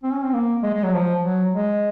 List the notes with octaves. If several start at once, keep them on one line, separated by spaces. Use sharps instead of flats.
C4
C#4
C4
A#3
G#3
G#3
F#3
F3
F#3
G#3